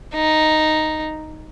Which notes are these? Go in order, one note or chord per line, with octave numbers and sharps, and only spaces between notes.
D#4